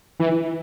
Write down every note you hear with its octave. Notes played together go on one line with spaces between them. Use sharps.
E3